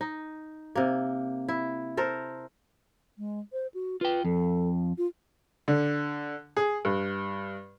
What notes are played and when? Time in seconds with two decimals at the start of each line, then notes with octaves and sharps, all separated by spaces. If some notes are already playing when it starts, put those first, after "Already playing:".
0.01 D#4
0.75 C3 A#3
1.49 E4
1.97 A4 A#4 C5
3.17 G#3
3.53 C5
3.74 F#4
4.01 F4 B4 G5
4.25 F2 A4
4.98 F4
5.68 D3
6.57 G#4
6.85 G2